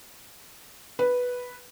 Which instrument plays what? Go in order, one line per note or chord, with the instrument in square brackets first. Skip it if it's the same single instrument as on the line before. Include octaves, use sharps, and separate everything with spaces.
[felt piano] B4